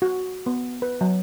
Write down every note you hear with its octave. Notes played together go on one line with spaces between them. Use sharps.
F#4
B3
B4
F#3